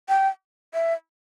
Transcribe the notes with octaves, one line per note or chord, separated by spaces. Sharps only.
G5
E5